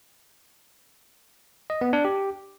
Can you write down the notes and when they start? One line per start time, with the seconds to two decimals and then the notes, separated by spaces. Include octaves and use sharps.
1.70 D#5
1.81 B3
1.93 D4
2.05 G4